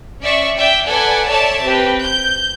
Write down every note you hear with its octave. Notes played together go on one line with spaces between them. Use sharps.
C#4 D5 E5 C#6
D5 E5 G5
A4 B4 D5 F#5 G#5
A4 C#5 D5 E5 A5
C4 G4 B4
G6